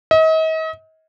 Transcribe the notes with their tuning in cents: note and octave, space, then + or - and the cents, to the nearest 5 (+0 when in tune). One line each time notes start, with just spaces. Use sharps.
D#5 +40